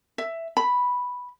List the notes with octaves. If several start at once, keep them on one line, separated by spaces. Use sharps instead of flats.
E5
B5